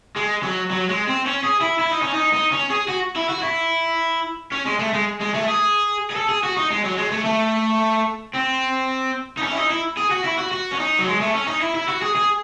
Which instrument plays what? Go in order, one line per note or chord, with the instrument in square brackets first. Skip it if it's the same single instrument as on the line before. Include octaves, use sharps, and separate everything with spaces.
[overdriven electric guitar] G#3
F#3
F#3
G#3
C4
C#4
G#4
E4
E4
D#4
C#4
D#4
D#4
C#4
G#4
F#4
E4
F#4
E4
C#4
G#3
A3
G#3
G#3
A3
G#4
G#4
A4
G#4
F#4
D#4
G#3
F#3
G#3
A3
A3
C4
D#4
C#4
E4
D#4
E4
G#4
F#4
E4
F#4
F#4
C#4
D#4
F#3
G#3
A3
C#4
D#4
E4
E4
F#4
G#4
G#4